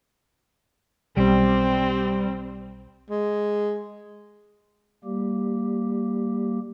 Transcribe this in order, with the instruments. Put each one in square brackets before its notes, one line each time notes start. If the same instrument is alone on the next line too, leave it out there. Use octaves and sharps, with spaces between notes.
[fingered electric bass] B1 [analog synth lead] G3 [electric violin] C4
[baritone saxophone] G#3
[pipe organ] G3 A#3 G4